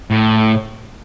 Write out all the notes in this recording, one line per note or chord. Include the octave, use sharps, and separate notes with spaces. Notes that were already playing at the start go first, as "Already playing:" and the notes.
A2